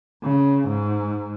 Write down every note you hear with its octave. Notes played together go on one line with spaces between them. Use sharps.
C#3
G#2